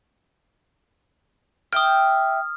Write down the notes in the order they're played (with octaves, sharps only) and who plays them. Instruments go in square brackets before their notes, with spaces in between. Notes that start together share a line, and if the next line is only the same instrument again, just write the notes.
[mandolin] E5 G5 [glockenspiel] D#6 F6